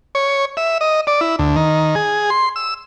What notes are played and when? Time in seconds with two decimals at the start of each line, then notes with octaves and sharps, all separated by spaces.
0.15 C#5
0.57 E5
0.81 D#5
1.07 D5
1.21 E4
1.39 D2
1.56 D#3
1.95 G#4
2.30 C6
2.56 E6